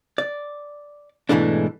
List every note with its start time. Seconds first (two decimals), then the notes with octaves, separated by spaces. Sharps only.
0.18 D5
1.29 G#2 B2 E3 G#3 A3 D4